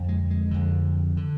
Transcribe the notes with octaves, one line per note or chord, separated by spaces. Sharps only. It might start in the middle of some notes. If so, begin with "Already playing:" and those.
Already playing: F2 D3
G#3
G#3
F2 D3
D3